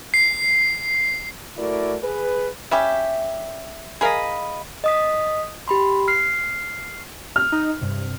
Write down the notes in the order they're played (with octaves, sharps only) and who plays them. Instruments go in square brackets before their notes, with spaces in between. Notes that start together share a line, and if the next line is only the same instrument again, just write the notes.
[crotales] C7
[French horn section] A3 E4 F#4 A#4 D5
G#4 B4
[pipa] G3 C#4 G4 [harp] E5
[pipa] G#4 A#4 F5 [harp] D#5 B5
[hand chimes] D#5 D#6 B6
G4 B5 C6
F6 C7
[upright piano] F6
[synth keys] D#4
G2 C3